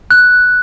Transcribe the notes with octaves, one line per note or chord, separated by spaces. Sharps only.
F#6